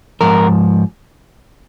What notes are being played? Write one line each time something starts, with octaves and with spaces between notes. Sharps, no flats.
G#2 F3 A#4